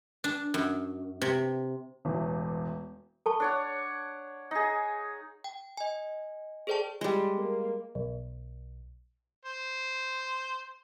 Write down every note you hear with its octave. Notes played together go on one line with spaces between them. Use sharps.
D4
F#2
C3
E1 A1 E2
A4 A5 C#6
D4 C#5 F#5
D#4 G#4
G5
D#5 G#5
G#4 A4 C5 D5 G5 A5
G3 G#3
A#3
B1
C5